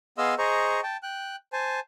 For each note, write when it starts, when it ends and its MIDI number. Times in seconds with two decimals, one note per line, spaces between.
0.18 0.35 59
0.18 0.35 68
0.18 0.35 75
0.18 0.35 77
0.18 0.35 84
0.18 0.35 88
0.38 0.81 68
0.38 0.81 72
0.38 0.81 75
0.38 0.81 82
0.38 0.81 85
0.83 0.97 79
0.83 0.97 81
1.03 1.36 79
1.03 1.36 90
1.53 1.80 72
1.53 1.80 80
1.53 1.80 81